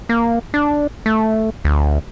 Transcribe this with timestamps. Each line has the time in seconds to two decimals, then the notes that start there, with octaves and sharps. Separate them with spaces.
0.09 A#3
0.54 D4
1.06 A3
1.65 D2